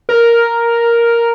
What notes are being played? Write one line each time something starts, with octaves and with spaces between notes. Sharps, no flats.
A#4